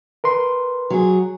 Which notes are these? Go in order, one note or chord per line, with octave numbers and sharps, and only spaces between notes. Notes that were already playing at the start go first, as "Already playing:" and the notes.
A#4 B4 C6
F#3 G#4